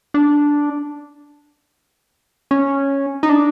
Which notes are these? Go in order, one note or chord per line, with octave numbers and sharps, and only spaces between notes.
D4
C#4
D#4
D4